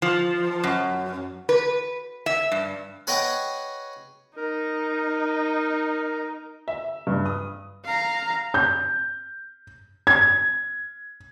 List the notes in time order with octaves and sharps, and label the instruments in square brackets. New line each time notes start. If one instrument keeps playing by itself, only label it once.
[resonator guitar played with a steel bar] F3
F#2
B4
E5
G2
[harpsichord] G#4 B4 C#5 D#5 F#5 G5
[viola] D#4 [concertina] A#4
[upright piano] E5
G2
D#6
[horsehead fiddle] F5 A#5
[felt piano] G6
G#6